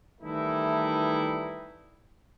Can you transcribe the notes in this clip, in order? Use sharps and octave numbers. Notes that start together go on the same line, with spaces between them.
D#3 E3 G3 A3 D#4 E4